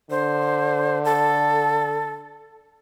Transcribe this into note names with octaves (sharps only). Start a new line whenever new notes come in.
D3 C5
A4